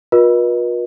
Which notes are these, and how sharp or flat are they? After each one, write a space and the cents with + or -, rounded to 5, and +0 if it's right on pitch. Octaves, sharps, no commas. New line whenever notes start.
F4 +45 B4 -45 D#5 +0